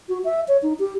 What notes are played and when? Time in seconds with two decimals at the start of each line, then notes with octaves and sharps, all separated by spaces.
0.09 F#4
0.24 E5
0.48 C#5
0.63 D#4
0.79 G4